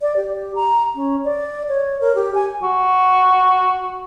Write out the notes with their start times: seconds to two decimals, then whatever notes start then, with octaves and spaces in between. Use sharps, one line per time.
0.01 D5
0.16 G4
0.55 A#5
0.95 C#4
1.25 D5
1.68 C#5
2.01 A#4
2.15 G4
2.35 G#5
2.63 F#4